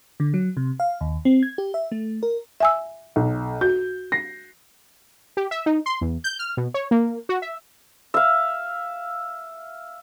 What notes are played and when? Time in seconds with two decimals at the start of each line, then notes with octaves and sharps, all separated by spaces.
0.20 D3
0.34 F#3
0.57 C3
0.80 F5
1.01 D#2
1.25 C4
1.43 G#6
1.58 G4
1.74 E5
1.92 A3
2.23 A#4
2.60 E5 G#5 E6
3.16 B1
3.61 F#4 G6
4.12 A#6 C7
5.37 G4
5.51 E5
5.66 D#4
5.86 C6
6.01 E2
6.24 G6
6.39 F6
6.57 B2
6.74 C#5
6.91 A#3
7.29 F#4
7.42 E5
8.14 E5 F5